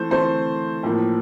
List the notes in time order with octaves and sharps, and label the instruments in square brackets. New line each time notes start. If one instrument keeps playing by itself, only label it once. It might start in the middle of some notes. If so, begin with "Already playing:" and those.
Already playing: [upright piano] E3 A3 C4 C5
E3 A3 C4 C5
A2 F3 A#3